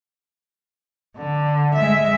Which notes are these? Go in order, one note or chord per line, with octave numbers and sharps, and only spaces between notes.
D3
G#3 E5